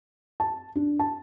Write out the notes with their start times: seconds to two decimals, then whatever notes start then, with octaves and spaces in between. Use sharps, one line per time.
0.40 A5
0.75 D4
0.99 A5